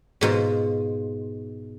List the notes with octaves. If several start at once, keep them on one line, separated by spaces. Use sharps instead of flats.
G#2 B2 F4